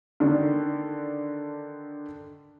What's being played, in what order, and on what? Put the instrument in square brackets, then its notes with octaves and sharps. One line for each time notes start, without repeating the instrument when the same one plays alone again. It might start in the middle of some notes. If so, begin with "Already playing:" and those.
[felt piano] D3 D#3 D4